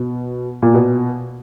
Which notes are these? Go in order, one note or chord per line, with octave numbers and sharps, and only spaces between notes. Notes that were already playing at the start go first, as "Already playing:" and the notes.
Already playing: B2
A#2
B2